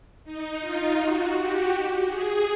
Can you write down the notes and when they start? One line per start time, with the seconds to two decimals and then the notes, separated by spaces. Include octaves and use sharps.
0.25 D#4
0.60 F4
0.98 F#4
1.34 G4
2.07 G#4